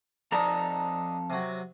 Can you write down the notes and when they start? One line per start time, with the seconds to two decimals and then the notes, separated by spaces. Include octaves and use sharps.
0.32 F2 D4 D#4 A4 A#5
1.30 C3 F#3